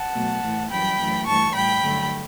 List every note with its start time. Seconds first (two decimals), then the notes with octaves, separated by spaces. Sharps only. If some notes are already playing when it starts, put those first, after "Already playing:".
Already playing: F#5 A5
0.13 B2 F#3 A3
0.41 A2 E3 A3
0.70 F#2 E3 G3 G5 B5
0.98 F#2 E3 A3
1.26 G2 E3 A3 A5 C#6
1.54 A2 G3 G5 B5
1.82 G2 D3 F#3 A3